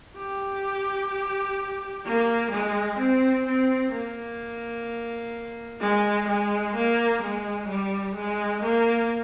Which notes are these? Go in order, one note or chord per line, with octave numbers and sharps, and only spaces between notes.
G4
A#3
G#3
C4
C4
A#3
G#3
G#3
A#3
G#3
G3
G#3
A#3